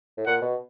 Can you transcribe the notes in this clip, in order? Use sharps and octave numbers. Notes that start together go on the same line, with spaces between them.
A2
A#2 F#5
B2